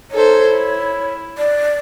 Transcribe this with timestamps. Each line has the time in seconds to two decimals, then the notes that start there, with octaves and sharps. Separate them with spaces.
0.11 D#4 A4 C5 C#5
0.46 E4
1.38 D5